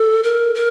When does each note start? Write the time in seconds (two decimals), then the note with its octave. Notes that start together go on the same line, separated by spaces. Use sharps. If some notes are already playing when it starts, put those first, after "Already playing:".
Already playing: A4
0.23 A#4
0.55 A#4